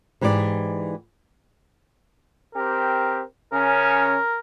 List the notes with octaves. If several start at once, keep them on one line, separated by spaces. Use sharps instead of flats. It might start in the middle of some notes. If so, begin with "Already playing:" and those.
G#2 E3 G4 C5 D5
C4 G4 A#4
C#3 C#4 A#4